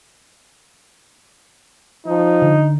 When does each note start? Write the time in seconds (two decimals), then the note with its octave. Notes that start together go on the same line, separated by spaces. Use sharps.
2.07 F3 D#4
2.42 D3